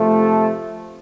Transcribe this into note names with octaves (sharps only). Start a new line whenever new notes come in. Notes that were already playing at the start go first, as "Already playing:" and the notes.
Already playing: C3 F3 A3